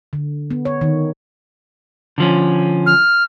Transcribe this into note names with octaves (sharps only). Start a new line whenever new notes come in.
D3
B3
C#5
D#3
D3 F3 C#4
F6